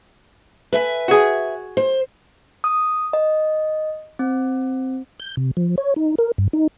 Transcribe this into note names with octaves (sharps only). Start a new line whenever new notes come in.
B4 E5 G#5
F#4 G#4
C5
D#6
D#5
C4
G6
C3
F3
C#5
D#4
A#4
G2
D#4